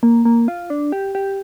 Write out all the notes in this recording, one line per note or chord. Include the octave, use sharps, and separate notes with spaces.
A#3
A#3
F4
D4
G4
G4